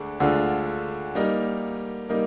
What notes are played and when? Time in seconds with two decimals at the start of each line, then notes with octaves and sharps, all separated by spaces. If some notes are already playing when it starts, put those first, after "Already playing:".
Already playing: D2 D3 G#3 D4
0.20 D2 D3 G#3 D4 F4
1.15 G3 A#3 D#4 A#4
2.09 G3 A#3 D#4 A#4